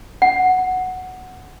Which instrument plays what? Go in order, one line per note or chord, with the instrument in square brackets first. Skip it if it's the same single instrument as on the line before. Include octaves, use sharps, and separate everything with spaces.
[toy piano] F#5